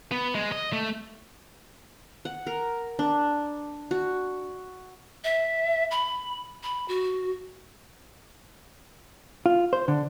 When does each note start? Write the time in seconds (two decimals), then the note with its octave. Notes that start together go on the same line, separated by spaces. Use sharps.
0.12 B3
0.35 G#3
0.52 D#5
0.73 A3
2.25 F#5
2.47 A#4
2.99 D4
3.91 F#4
5.24 E5
5.91 B5
6.63 B5
6.88 F#4
9.46 F4
9.73 C5
9.88 D3